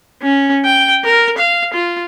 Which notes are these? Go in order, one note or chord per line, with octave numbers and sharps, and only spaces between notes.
C#4
G5
A#4
F5
F4